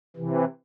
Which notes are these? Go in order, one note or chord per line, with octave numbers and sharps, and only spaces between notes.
C3 E3